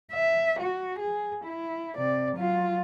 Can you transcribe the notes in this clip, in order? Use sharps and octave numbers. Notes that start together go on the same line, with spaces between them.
E5
F#4
G#4
E4
C3 D5
F#3 F4